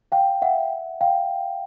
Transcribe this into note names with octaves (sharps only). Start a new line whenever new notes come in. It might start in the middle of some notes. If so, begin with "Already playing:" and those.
F5 G5
E5 F#5
F5 G5